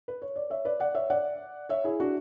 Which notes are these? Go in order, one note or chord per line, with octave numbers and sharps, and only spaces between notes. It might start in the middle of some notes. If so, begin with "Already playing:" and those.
B4
C#5
D5
C#5 E5
B4 D5
D5 F#5
C#5 E5
D5 F#5
C#5 E5
E4 G#4
D4 F#4